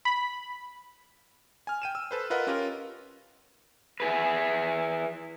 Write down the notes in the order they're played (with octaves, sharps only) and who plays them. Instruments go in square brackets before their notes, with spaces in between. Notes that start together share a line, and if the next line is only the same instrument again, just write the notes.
[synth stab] B5
[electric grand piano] G#5 F6
G5 D#7 E7
E6
A4 B4 C5
F4 A#4 B4 D#5 F#5
C#4 F4 G4 A#4
[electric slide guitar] E4 G#4 B4